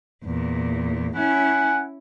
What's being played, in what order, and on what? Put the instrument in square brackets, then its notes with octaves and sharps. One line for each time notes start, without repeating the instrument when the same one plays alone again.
[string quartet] E2 A#2
[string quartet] C#4 E4 [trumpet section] F#5 G#5